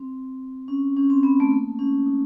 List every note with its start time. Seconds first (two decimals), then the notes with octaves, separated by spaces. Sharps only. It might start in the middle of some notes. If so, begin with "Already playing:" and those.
Already playing: C4
0.68 C#4
0.97 C#4
1.10 C4
1.23 B3
1.40 A3
1.51 A#3
1.79 C#4
2.06 D#4